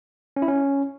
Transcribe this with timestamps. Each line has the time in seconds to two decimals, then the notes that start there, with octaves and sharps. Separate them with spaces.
0.36 C#4
0.42 E4
0.48 C#4